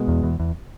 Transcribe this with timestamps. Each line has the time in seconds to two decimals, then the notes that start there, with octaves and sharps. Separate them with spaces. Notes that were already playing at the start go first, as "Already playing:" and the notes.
Already playing: B2 G#3 B3
0.08 E2
0.23 E2
0.40 E2